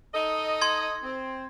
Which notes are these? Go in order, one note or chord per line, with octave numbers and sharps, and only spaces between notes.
D#4 A4 D#5
C6 G#6
C4